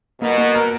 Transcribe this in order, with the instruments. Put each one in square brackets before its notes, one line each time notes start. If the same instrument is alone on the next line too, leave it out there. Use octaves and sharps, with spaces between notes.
[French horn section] B2 [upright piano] A#3
[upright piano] A#3
A#4